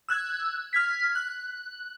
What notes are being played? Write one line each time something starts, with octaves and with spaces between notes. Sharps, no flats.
E6 F#6 G#6
F6 G#6 B6
F#6